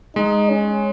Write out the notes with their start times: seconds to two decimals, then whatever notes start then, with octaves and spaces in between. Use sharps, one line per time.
0.16 G#3 D#4
0.50 C#4